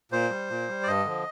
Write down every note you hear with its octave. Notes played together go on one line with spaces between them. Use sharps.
A#2 C5
G3
A#2
G3
D5
G2 D#5
D3 F3